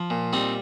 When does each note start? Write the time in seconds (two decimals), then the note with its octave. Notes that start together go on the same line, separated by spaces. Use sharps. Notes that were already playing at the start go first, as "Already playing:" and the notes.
Already playing: F3
0.10 A#2
0.33 G3 C4 D#4